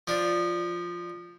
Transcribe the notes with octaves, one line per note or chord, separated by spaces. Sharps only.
F3 D4